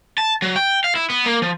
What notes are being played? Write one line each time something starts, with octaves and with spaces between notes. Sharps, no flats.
A5
F#3
G5
F5
E4
B3
A#3
F3